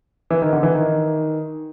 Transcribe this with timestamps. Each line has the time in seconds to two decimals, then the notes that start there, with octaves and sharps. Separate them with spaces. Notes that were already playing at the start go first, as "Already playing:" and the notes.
0.31 E3
0.42 D#3
0.53 D3
0.63 E3
0.75 D#3